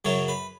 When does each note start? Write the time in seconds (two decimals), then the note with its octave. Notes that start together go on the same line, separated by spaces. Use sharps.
0.05 F#2 C#3 F#3 C#5
0.28 B4